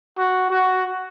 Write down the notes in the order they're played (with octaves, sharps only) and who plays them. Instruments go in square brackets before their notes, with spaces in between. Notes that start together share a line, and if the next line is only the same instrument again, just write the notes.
[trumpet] F#4
F#4